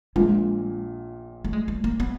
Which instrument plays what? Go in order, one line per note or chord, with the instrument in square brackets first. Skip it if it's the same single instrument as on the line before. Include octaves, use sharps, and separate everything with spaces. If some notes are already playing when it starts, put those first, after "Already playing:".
[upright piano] A#1 A#2 [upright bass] G#3
[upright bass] A3
G#3
A3
A#3
B3